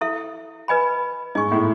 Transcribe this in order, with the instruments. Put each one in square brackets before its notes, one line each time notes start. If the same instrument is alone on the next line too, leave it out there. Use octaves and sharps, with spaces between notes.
[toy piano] E4 A4 E5
B4 D#5 G#5 B5
[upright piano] G#2 [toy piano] G#4 D#5 G#5 C#6
[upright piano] A2